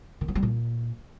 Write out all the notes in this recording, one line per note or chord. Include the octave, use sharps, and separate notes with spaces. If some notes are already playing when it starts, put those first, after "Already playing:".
D#3
F#3
G3
A#2